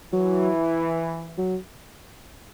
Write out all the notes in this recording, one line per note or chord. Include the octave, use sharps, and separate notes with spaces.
E3 F#3
F#3